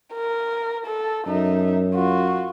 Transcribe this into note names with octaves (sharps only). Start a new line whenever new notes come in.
A#4
A4
F#2 D#4 E5
F4 F#4